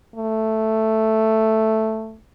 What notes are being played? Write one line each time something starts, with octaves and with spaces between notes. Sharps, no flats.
A3